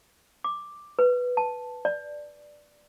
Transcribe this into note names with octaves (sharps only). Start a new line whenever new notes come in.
D6
B4
A5
D5